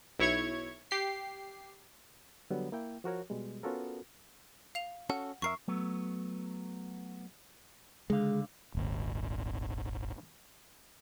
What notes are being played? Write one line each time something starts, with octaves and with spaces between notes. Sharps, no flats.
B1 E4 C#5 C#6 G#6
G4 C7
D3 F#3 G3 B3
A#3 E4 G5
F3 F#4 A#4 C#5
B2 G3 G#3
B3 C#4 F4 F#4 A4 A#4
F5 F7
C#4 F#4 A4 F#5
F2 A#4 E5 C#6 C7
F#3 A3 B3
C#2 D3 G#3 F5
D#1 G#1